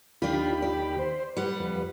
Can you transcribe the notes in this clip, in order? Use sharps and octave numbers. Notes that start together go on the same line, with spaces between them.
D#2 D4 F4 G4 B5
D5
C5
G3 B4 F#5
F2 B4